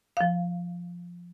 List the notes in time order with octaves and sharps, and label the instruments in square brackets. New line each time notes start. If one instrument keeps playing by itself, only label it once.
[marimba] F3 F5